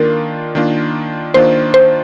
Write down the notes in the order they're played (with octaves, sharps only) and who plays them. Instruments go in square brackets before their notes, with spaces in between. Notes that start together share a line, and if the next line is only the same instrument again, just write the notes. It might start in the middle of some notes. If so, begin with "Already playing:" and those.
Already playing: [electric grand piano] D#3 A#3 D4 F4 [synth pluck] A#4
[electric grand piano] D#3 A#3 D4 F4
[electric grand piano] D#3 A#3 D4 F4 [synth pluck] C5
[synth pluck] C5